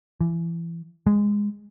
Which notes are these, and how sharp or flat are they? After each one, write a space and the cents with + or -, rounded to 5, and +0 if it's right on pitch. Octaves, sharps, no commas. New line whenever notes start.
E3 +30
G#3 -15